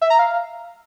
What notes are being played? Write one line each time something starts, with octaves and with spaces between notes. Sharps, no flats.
E5
A#5
F5